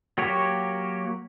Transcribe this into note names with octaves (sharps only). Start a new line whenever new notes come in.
F#3 A#3 F#4 G4 C#5